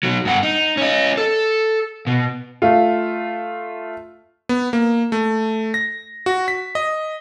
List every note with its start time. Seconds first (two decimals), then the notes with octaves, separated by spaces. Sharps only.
0.03 B2 F#3
0.25 G2 F#5
0.43 D#4
0.77 C#4 D#5
1.17 A4
2.07 B2
2.62 A3 F4
4.49 B3
4.73 A#3
5.12 A3
5.74 A#6
6.26 F#4
6.48 B6
6.75 D#5